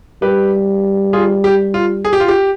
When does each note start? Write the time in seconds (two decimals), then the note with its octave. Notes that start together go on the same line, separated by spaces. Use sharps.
0.22 G3 G4 B4
1.13 F4 G#4
1.44 G4
1.74 F4
2.05 G#4
2.13 G4
2.20 F4
2.28 G4